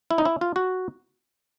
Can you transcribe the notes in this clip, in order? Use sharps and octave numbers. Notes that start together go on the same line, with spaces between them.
E4
D#4
E4
F4
F#4